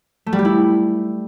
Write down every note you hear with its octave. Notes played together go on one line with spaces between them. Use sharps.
A3
G3
G4
E4